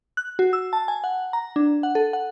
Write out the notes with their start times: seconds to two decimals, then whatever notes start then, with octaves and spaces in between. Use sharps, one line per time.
0.17 F#6
0.39 F#4
0.53 E6
0.73 A5
0.88 G#5
1.04 F#5
1.33 A#5
1.56 D4
1.83 F#5
1.95 A4
2.13 F#5